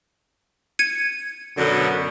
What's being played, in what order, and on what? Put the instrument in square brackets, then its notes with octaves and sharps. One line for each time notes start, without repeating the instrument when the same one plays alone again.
[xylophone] G#6 C#7 D#7
[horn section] F#2 B2 D3